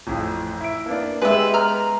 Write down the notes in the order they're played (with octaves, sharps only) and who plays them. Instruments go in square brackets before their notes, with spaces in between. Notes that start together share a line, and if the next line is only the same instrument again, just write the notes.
[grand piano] A1 F2 F3
E4 D7
A#3 B3 D4
[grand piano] G#3 B3 G4 [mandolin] B4 E5
[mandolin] A#5 F6